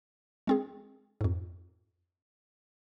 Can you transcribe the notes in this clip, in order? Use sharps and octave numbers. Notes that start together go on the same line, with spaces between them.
G#3 C4 G#4
F2 G#2